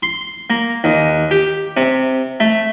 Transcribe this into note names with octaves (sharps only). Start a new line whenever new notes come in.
C6
A#3
D#2
G4
C3
A3